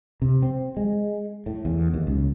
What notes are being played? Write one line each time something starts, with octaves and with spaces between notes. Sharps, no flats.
C3
C4
G#3
A2
E2
D#2
C#2